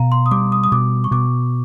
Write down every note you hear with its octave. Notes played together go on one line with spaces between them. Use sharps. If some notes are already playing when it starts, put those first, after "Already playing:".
Already playing: B2 F5 A#5
C6
D#6
G3 D6
D#6
D#6
B2 D6
C#6
B2 D6